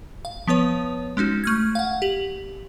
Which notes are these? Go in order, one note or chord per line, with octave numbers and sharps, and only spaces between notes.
F5
F3 B3 B4 C#5
G#3 C#4 D#4 F#4
A3 F6 G#6
F5 F#5
G4 F#7